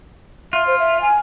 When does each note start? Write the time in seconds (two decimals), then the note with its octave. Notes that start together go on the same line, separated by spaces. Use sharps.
0.53 F4 E5
0.67 C5
0.79 E5
1.02 G#5